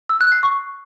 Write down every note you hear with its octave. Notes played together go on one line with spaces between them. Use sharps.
E6
F#6
C7
C#6